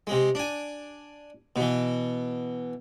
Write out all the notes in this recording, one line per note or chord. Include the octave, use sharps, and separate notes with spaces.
C3 G#3
D4 G#5
B2 E3